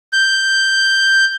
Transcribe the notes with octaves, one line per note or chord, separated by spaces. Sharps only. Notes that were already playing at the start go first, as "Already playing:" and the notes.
G6